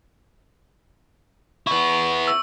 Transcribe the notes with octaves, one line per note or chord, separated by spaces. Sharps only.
B3 E4 C#6
E6